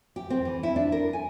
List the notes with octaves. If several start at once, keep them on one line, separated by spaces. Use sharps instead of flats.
G4
C4
E3
E4
D4
A#4
G#5